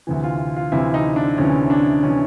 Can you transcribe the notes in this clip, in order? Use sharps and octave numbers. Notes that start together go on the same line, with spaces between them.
D2 C3 E3
F4
F4
D2 C3 E3 E4
D#4
D4
D2 C3 E3 C#4
D4
C3 E3 C#4